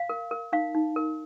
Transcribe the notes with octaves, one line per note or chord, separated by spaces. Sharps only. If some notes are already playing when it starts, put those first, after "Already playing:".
Already playing: F5
A#4
A#4
D#4 F5
D#4
A#4